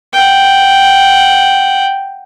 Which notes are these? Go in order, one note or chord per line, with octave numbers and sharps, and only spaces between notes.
F#5 G5